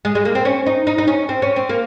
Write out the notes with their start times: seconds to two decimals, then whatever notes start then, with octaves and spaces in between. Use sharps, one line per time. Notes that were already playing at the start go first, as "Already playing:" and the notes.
0.05 G#3
0.15 G#3
0.25 A#3
0.35 C4
0.45 C#4
0.66 D#4
0.87 D#4
0.98 D#4
1.08 C#4
1.29 C4
1.42 C#4
1.56 C4
1.69 A#3